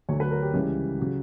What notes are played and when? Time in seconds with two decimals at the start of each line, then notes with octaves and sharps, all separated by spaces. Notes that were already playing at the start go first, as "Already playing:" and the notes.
0.09 D2 D3 F#3 C#5
0.20 B4
0.31 A#4
0.43 G4
0.54 C#2 C#3 E3 G3 G4
0.99 C#3 F#3